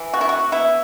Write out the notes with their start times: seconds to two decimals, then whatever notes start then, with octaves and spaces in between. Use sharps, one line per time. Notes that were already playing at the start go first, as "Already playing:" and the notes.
Already playing: E3
0.14 B3 F#4
0.21 E4
0.29 B3 F#4
0.52 B3 E4